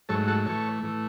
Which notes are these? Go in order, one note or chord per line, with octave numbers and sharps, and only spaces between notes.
G#2 F#3 A3 A4 C#5
F#4 A4
A2 E3 A3 A4 C#5
A2 E3 A3